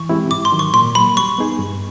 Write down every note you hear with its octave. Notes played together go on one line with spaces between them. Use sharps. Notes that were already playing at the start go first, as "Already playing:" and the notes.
Already playing: E3 C#6
G#3 C4 E4 G4
G#2 D6
C6
D#3 F#3
C#6
A#2 C6
F#3 A#3 B5
G3 C#6
B3 D#4 G#4
G2